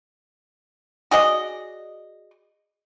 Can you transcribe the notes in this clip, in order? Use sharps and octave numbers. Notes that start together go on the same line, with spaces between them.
F#4 G#4 D5 D#5